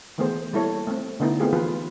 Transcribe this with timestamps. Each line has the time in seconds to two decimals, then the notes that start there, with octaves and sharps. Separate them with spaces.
0.18 D#3 E3 A3 B3 G#4 C5
0.53 G3 A#3 E4 A4 C#5
0.87 A3 C4
1.20 D3 A3 B3 D#4 E4
1.40 A3 B3 C4 F4 G4 G#4
1.53 E3 F3 F4 G#4 B4